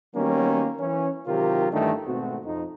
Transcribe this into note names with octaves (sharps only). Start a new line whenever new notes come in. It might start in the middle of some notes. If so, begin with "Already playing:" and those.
D#3 F#3 G3 A#3 B3 C#4
E3 C#4
C3 D#3 F#3 F4 G4 A#4
G2 D#3 E3 A3 D4 D#4
G#1 B2 A3 C4 F#4
F2 D#4